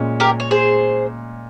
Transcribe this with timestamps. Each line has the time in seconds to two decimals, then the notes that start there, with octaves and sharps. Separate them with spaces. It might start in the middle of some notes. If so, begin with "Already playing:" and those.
Already playing: A#2 G#3 C#4
0.20 G4 A#4
0.40 C#5
0.51 G#4 C5